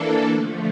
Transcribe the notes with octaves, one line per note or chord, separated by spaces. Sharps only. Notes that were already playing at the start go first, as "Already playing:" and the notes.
Already playing: E3 A#3 D4 A4
D3 F3 A3